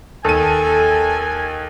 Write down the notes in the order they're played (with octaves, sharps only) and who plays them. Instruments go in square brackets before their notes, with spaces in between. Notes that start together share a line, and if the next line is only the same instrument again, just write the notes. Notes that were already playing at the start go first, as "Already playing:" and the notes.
[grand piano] D#2 D#7 [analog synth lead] A4 [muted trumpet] G#5